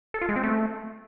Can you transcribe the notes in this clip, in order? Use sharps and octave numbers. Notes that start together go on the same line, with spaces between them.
A4
F4
G#3
C4
A3